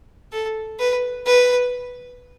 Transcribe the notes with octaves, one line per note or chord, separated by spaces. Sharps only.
A4
B4
B4